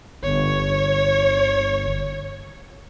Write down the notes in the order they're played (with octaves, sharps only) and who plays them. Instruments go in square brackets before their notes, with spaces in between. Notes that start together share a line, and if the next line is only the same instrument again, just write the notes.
[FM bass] G1 [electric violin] C#5